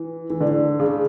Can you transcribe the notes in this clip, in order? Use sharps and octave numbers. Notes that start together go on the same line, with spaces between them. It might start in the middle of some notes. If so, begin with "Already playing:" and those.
Already playing: E3
E3
D3
C#3